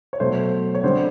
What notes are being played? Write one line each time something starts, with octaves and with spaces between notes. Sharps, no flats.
C#5
B2 F#3 A3 C5
C#5
D3 G3 C4 C5